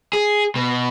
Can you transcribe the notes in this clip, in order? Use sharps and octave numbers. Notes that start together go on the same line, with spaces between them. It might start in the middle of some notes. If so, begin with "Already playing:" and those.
G#4
B2